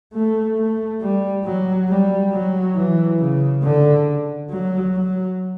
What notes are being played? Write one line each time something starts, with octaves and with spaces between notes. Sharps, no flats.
A3
A3
G3
F#3
G3
F#3
E3
C#3
D3
F#3
F#3